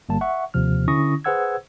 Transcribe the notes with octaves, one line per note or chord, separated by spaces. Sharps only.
G1 G3 A#3 A5
E5 F#5 C#6
D#2 C3 F3 F6
D3 C#4 E4 C#6 D#6 A#6
G#4 B4 C5 F#5 E6 G#6